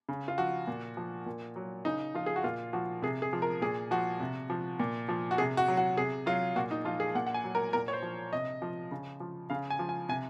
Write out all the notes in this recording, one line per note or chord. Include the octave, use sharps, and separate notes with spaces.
C#3
F4
F3 F#4
A#2
F3
A#2
F#3
C#3 D#4
F3 F4
G#4
F#4
A#2 F4
F3 F#4
C3 G#4
G#4
F3
A#4
A#2 G#4
F3 F#4
C3
F3
A#2
F3
F#4
C3 G#4
F#4
F#3
F#4
C3 G#4
F#3 F4
A#2 F#4
D#4
F3 F4
G#4
A#2 F#5
F#5
G#5
F#3
A#4
A#2 A#4
C#5
C5
F3
C3 D#5
F3
C#3
F3
C#3 F5
G#5
F3
G#5
C3 G#5